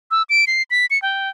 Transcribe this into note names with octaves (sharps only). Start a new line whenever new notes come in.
E6
D7
C7
B6
C#7
G5